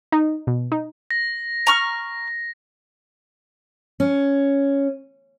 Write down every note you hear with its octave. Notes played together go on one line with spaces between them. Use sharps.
D#4
B2
D#4
A#6
A#5 C#6 F6
C#4